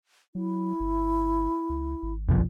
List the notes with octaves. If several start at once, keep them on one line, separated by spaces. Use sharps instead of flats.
F#3 E4
G1
C#2
G#1
F1 B1 F3